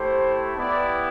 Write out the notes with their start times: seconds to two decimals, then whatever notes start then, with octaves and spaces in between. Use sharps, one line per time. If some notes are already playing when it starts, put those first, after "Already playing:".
Already playing: A3 E4 G4 C5
0.56 B3 E4 G4 D5